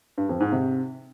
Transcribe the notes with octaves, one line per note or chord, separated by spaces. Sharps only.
G2
F2
G#2
C3